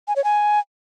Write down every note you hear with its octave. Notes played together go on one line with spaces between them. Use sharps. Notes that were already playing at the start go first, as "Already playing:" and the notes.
G#5
C#5
G#5